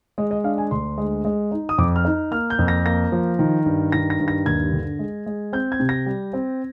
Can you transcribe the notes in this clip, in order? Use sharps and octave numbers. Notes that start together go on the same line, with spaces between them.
G#3 D#5
D#5
D4 F5
G#5
D2 C6
G#3
G#3
D#4
D#6
F2 D6
F6
D#4
A#3 F6
G6
F2
A#6
A#3 A#6
F3
D#3
G2
D#3 A#6
A#6
G2
A#6
D#2 G#6
D3
G#3
G#3
C4 G6
G#6
C3
A#6
G3
C4